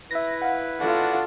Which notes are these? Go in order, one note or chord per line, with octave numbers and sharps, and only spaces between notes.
E4 B4 E5 A#6
F5 F#5
D4 F4 F#4 A4